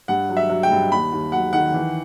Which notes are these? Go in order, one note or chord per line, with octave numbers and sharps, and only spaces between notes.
G2 F#5
F#3
E5
F#3
G5
G2
D#2 B5
D#2
F#3 F#5
D#3 F#5
E3